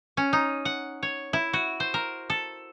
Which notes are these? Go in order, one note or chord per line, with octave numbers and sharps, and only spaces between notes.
C#4
D#4
F#5
C#5
E4
F#4
C5
A#4
A4